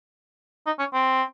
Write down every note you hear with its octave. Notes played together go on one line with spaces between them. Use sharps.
D#4
C#4
C4